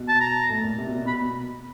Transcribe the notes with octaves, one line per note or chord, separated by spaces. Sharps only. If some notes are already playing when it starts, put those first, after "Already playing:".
Already playing: B2
A5
A#5
A2
A#2
C3
B2
A#2
B2 B5